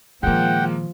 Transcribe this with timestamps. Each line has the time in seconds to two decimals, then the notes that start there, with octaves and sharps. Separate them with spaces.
0.23 A#2 D#3 F3 G#3 A#3 F#5 G5